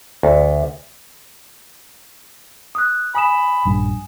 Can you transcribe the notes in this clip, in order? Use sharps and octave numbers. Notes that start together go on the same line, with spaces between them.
D2
D#6 F#6
G#5 B5 D#6 E7
A#1 G2